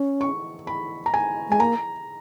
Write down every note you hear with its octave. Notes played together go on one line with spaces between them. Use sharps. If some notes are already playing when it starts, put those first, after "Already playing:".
Already playing: C#4
C#6
B5
A#5
G#5
G#3 G#5
A#3 A#5